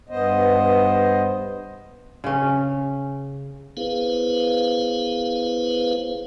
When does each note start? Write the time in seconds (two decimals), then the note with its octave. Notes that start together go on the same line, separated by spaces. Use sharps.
0.09 G2 B3 C5 D#5
2.24 C#3 C#4
3.77 B3 E4 G#4 B4 C5 F5